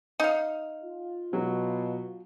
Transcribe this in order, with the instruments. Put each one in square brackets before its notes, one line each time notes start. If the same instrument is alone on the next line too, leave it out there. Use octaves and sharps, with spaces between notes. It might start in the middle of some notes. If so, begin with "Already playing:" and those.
[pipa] D#4 F5
[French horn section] F4
[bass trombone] B2 [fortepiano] F#3